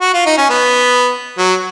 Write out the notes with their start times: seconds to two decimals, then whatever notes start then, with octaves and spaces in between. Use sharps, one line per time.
0.01 F#4
0.14 F4
0.26 D#4
0.38 C#4
0.50 B3
1.38 F#3